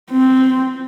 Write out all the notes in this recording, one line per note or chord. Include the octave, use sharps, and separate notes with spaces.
C4